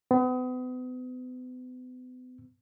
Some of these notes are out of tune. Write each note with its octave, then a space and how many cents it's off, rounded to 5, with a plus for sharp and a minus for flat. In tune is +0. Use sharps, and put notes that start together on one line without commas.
B3 +40